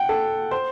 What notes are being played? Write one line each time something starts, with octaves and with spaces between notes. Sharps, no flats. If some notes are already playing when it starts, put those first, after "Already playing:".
Already playing: F#5 G5
A4
C5